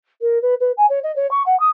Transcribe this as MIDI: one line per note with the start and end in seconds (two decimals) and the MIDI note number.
0.21 0.41 70
0.42 0.54 71
0.60 0.72 71
0.77 0.86 80
0.89 0.99 73
1.03 1.14 75
1.16 1.29 73
1.31 1.42 85
1.46 1.58 78
1.60 1.69 87